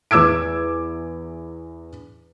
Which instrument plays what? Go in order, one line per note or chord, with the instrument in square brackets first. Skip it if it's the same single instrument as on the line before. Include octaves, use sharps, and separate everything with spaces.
[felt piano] E2 D6 E6 G#6 D7